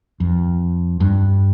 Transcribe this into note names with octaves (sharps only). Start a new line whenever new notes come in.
F2
G2